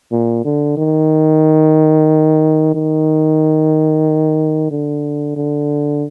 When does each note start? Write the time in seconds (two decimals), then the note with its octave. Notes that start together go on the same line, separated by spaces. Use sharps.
0.12 A#2
0.45 D3
0.77 D#3
2.74 D#3
4.71 D3
5.36 D3